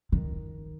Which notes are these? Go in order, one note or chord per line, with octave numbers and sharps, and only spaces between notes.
D#3